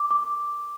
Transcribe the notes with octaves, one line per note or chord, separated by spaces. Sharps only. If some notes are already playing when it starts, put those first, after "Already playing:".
Already playing: D6
D6